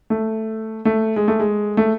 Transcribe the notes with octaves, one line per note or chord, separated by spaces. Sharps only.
A3
A3
G#3
A3
G#3
A3